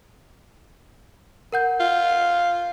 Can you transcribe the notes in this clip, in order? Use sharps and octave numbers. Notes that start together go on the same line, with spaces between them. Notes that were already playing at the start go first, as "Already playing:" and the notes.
A#4 F#5 G6
F4